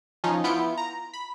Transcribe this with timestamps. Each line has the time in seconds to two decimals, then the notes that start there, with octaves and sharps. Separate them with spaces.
0.24 F3 C#4 D#4 F4
0.44 B3 E4 F4 G6 C#7 D7
0.77 A#5
1.14 B5